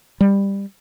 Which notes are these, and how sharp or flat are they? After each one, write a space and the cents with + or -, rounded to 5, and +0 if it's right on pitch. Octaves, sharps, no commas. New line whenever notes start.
G3 +15